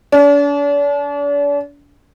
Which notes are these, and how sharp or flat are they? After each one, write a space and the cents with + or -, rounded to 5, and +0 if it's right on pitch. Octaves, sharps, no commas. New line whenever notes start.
D4 -40